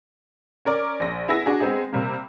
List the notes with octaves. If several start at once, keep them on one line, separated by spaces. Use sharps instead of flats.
C#4 A#4 D5
A#1 A#6
B3 E4 G#4 A#6
D4 F#4 G#4
G#3 B3 C4 D#4 G#4
C3 G3 A#3